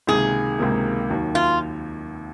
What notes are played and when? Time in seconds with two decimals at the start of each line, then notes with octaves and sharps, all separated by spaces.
0.07 C#2 C3 D#3 A#3 G#4
0.59 C#2 C3 D#3 A#3
1.10 D#2 D#3 F#3
1.35 F4